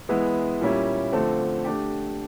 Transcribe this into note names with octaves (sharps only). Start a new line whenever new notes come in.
E3 G#3 B3 E4
A#2 G3 A#3 C#4 E4
D3 F3 A3 C4
A3 D4 G4